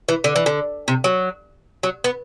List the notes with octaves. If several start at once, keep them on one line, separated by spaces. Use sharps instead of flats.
E3
D3
E3
D3
C3
F#3
F#3
B3